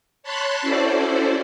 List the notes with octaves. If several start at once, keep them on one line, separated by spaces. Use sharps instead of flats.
C#5 A5 B5 C6 F#6
C#4 E4 F#4 A4 C5 D5